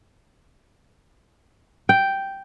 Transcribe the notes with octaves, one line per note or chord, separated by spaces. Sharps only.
G5